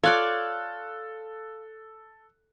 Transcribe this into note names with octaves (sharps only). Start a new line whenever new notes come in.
F4 A4 C#5 D5 D6 F#6